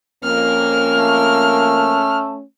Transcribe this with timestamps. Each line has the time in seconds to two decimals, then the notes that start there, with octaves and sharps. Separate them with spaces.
0.24 F2 A#3 C#4 F6
0.97 A3